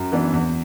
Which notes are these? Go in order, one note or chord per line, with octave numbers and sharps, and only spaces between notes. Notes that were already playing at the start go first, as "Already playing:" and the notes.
Already playing: F#2
E3 B3 D4
E2